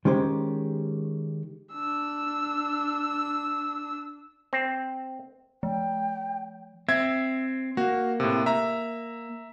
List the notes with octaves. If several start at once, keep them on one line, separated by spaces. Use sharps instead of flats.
D#3 G#3 C#4 G4 C5
D4 E6
C4
F3 G5
C4 E5 G#6
A#3 F#4
A2 C3
E5 A#5